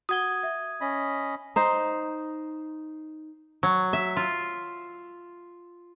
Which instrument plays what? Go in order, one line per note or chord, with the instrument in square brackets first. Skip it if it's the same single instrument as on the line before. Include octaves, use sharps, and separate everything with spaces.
[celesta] F#4 F#5 G7 [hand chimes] D#6 G#6
[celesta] E5
[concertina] C#4 D#5 B5
[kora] D#4 C5
[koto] F#3
E5
F4